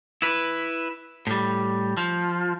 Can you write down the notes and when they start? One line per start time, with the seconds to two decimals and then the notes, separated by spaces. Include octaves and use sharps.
0.22 E4 B4
1.27 A2 G3
1.97 F3